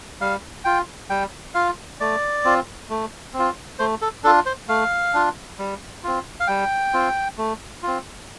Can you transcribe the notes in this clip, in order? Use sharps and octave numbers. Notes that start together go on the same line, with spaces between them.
G3 F5
F4 G5
G3 G5
F4 F5
A3 D5
C4 F4
A3
C4
F4
A3 C5
A4
D4 F4 A4
C5
A3 F5
D4 F4
G3
C4 F4
F5
G3 G5
C4 F4
A3
C4 F4